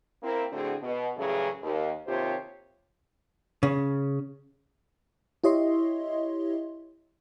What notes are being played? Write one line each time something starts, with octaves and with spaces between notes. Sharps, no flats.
A#3 C4 E4
A2 D3 A3 C4 F#4 G#4
B2
A2 C#3 E3 F#3 G3 G#4
D#2
D#2 C3 F4 G4 C5 C#5
C#3
E4 G4 C#5 D#5 E5 C6